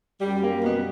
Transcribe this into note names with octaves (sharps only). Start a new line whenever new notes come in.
F#2 G3
A#3
G3
B2 B3